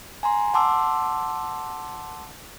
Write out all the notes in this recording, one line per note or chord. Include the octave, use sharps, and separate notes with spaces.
G#5 A#5 C6
F#5 A5 C6 D6 E6